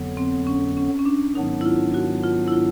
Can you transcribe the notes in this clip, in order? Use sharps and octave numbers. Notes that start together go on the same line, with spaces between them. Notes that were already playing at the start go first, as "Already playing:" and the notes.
Already playing: F2 D3 F#3 B3
C4
C#4
C#4
C#4
D4
G#2 D#3 F#3 B3 D4 D#4
E4
F4
F#4
F4
E4
F4